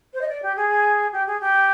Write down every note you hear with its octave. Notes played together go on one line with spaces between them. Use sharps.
C5
D#5
D5
G4
G#4
G4
G#4
G4